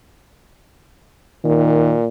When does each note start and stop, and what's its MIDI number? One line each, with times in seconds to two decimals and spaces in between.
1.44 2.07 46
1.44 1.96 51